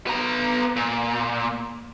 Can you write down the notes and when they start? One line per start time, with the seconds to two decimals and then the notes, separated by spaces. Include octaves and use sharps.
0.07 B3 A#5
0.76 A#2